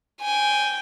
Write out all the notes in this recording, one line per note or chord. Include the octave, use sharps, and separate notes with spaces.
G5 G#5